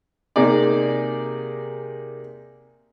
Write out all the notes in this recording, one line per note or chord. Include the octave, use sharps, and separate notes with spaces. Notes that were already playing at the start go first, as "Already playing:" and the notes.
C3 A#3 D#4 G#4 D5